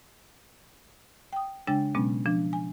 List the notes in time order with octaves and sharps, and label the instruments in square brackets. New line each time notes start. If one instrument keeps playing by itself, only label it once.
[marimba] G5 D#6
C#3 G#3 D4 G5 A6
B2 F#3 G#3 B3 C#4
F3 D4
G#5